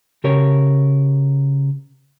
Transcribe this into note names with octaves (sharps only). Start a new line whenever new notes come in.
C#3 G4 A#4 C#5